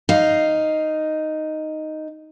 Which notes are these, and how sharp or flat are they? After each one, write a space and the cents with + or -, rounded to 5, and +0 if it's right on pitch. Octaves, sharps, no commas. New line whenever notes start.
D#4 +0 F5 +0